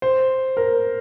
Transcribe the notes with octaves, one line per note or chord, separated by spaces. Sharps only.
C5
A#4